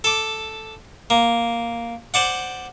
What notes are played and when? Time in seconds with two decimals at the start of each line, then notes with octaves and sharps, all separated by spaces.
0.04 A4 D6
1.10 A#3
2.14 C5 D5 F#5